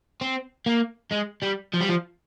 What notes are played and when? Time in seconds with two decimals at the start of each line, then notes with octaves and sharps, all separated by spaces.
0.21 C4
0.66 A#3
1.12 G#3
1.43 G3
1.73 F3
1.81 G3
1.89 F3